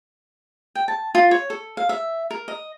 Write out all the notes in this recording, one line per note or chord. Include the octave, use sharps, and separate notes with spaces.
G5
A5
F4
C#5
A4
F5
E5
A#4
D#5